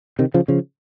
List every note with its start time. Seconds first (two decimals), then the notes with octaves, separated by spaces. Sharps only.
0.19 C3 D#3
0.34 C#3 F3
0.48 C#3 F3